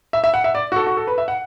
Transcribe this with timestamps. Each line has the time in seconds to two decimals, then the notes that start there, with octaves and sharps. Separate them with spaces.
0.13 E5
0.24 E5
0.34 F#5
0.44 E5
0.55 D5
0.72 F#4
0.76 A4
0.87 F#4
0.97 A4
1.07 B4
1.18 E5
1.28 F#5